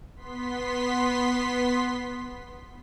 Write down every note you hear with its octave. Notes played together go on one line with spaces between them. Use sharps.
B3 C6 B6